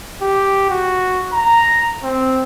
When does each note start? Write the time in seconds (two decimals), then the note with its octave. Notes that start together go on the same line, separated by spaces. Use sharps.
0.22 G4
0.70 F#4
1.32 A#5
2.03 C4